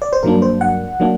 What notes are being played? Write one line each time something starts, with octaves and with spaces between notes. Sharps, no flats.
D5
C5
G2 F#3 A#3 D4 A#4
C5
F#5
F#3 A#3 D4